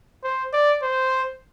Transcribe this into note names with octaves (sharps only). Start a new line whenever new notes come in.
C5
D5
C5